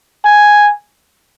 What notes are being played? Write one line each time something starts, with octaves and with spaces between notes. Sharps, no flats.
G#5